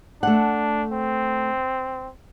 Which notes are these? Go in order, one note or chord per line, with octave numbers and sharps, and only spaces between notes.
A3 D4 F#5
C4